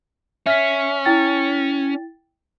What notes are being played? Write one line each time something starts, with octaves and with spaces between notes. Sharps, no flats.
C#4 E5 F6 B6
E4 G5 A6